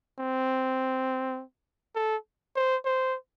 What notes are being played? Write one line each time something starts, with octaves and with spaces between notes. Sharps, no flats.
C4
A4
C5
C5